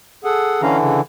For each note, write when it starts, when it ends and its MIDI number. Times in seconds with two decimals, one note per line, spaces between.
0.24 0.62 68
0.24 0.62 69
0.24 0.62 78
0.62 1.01 50
0.62 1.01 52
0.62 0.77 61
0.62 0.77 77
0.62 0.77 82
0.79 1.00 49